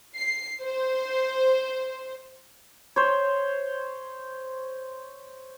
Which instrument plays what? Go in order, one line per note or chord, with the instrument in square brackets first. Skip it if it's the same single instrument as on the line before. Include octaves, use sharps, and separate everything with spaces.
[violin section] C7
C5
[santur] C5 C#5